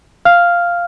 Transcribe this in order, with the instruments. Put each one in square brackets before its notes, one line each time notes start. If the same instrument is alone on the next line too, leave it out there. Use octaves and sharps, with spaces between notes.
[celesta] F5 F6